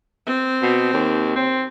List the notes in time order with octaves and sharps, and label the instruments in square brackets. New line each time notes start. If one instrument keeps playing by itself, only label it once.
[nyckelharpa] C4
[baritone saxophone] B2
D#2
C4